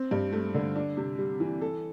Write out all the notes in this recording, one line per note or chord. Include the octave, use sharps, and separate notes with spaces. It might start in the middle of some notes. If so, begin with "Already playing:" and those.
Already playing: C4
G2
A3
D3
D4
C3
G3
E3
A4